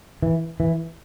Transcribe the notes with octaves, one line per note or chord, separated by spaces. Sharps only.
E3
E3